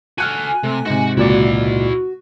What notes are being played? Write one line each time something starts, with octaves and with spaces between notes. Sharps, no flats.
F#4 A4 G#5 F6 F#6 D#7
C3 A3
G#2 C3 F#4 F#5
C#2 A#2 E4 F#4 D5 F#5